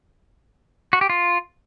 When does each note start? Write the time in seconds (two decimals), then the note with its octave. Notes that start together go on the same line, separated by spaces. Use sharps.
0.93 F#4
1.01 G4
1.10 F4